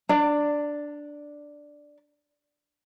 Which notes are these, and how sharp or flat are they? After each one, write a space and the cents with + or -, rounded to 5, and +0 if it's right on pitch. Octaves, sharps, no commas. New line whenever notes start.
D4 +0 D5 +0 A5 +45